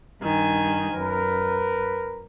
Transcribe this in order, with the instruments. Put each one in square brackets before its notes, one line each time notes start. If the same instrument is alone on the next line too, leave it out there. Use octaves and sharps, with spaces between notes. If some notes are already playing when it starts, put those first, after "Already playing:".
[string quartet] G2 D#3 G#5
[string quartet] F#2 [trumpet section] A#4 B4